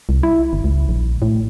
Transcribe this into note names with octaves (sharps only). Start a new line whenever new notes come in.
C2
E4
G1
C#2
A#1
A2